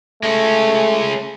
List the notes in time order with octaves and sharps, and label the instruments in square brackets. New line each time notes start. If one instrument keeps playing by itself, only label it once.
[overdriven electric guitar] G#3 C#4 [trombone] A3